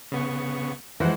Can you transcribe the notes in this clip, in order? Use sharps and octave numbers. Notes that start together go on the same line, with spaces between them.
C#3 B3 C#6
E3 F3 G#3 C5 F#5